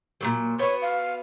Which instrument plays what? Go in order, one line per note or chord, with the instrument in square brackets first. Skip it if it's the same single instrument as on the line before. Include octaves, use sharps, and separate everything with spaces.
[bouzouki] A#2 C#3 F#3
[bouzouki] B3 F#4 [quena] C#5
[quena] F5